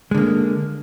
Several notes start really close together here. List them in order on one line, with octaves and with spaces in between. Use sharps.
G#3 D3 A#3